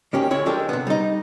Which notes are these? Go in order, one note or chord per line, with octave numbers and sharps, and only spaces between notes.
D#3 A#3 C#4 G4
D2 E4 C#5
F3 G#3 D4 G4 A4 A#4
C3 B3
G3 D#4